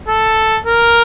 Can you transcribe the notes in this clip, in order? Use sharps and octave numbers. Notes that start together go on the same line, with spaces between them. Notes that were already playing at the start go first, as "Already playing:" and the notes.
A4
A#4